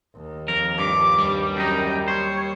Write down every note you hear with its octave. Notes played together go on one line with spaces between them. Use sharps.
D#2
F2 A#4
G2 D6
G3
F#2 D#4 G5
C5 C#5